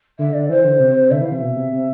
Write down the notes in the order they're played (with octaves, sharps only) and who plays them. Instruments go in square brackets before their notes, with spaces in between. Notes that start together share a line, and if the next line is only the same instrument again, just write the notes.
[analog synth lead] D3 [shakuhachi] E5
[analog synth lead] D3 [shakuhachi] D5
[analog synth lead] E3 [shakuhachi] C5
[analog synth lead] D3
C3
[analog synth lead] D3 [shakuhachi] E5
[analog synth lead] E3 [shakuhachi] F5
[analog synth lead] C3 [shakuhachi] E5
[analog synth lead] B2
C3
C3